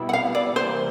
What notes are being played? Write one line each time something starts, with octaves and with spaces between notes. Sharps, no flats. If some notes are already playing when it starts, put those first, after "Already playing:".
Already playing: B2 G3 B3 E4
F#5
F5
D5
C3 E3 G3 A#3 C5